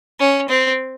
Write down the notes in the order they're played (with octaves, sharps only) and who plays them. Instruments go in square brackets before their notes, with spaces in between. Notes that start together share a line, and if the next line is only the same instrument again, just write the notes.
[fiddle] C#4
C4